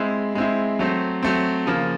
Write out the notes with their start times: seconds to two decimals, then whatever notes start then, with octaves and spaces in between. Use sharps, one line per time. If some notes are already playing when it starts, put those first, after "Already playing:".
Already playing: G#3 C4 E4
0.35 G#3 C4 E4
0.79 F#3 A3 C4
1.23 F#3 A3 C4
1.66 C#3 F3 A#3